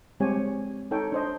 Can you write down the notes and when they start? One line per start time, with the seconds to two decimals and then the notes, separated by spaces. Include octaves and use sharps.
0.20 G3 G#3 C4 G4 C#5 G#5
0.91 D#4 A4 C#5 G5
1.12 D4 C5 D#5